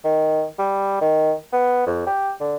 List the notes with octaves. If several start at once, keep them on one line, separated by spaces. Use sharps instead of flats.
D#3
G3
D#3
B3
F2
G4
D3